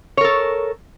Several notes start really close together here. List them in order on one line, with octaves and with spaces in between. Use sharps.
C#5 A#4 A4